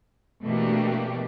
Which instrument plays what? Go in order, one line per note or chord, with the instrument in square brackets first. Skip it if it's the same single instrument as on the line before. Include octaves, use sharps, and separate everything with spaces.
[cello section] B2 E3 A3 A#3 D4 G4